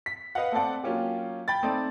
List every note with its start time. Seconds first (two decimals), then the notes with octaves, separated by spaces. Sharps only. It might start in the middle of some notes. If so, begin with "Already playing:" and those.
0.06 B6
0.35 B4 D#5 F5 F#5
0.52 A3 C4 A4 D5 F#5
0.84 F#3 A#3 C#4 F4 G4
1.48 G5 B5 A6
1.63 A3 C4 D#4 C5 D5